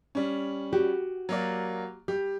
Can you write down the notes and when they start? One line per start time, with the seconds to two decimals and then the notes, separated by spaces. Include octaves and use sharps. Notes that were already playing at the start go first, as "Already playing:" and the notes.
0.15 G3 C#4
0.73 F#4 G4
1.29 F#3 A#3 D5
2.08 G3 G4